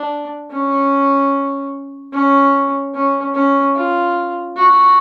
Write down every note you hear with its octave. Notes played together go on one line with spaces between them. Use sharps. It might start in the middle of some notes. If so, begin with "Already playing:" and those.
Already playing: D4
C#4
C#4
C#4
C#4
F4
F#4